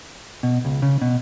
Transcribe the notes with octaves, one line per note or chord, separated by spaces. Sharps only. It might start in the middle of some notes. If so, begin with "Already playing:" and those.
B2
C#2
C#3
B2